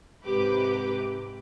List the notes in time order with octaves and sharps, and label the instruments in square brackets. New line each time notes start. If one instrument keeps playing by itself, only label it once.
[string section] G#2 C3 G4 B4 D6